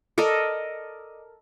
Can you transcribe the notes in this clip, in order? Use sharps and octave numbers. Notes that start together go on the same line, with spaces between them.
A4 A#4 D5 D#5